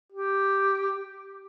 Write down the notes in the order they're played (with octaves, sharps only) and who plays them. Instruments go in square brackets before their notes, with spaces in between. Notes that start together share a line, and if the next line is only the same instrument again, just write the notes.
[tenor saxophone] G4